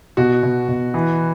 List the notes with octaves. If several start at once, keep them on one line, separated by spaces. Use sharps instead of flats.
B2 F#4
B2
B2
E3